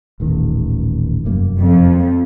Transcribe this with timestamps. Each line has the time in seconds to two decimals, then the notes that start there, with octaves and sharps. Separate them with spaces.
0.20 D#1 A1 D#3
1.25 F1 F#2 A#3
1.58 F2